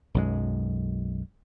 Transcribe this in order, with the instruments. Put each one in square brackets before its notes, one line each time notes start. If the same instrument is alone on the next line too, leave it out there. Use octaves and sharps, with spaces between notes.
[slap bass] B1 F#2 G#3